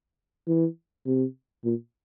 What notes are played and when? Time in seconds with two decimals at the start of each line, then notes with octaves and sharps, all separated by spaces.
0.48 E3
1.06 C3
1.65 A#2